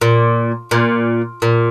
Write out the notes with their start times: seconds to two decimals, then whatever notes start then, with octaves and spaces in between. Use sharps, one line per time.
0.01 A#2
0.71 A#2
1.42 A#2